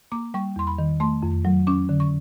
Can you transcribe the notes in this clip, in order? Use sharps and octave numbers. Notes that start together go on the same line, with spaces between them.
A#3 D6
G3 C#6
E2 C6
B5
D#3
A3 C6
F2
F#3
C#4 D6
D3
C#6